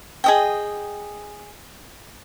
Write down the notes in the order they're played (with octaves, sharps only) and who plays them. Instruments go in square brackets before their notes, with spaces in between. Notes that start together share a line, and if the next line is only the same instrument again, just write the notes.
[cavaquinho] G#4 D#5 G5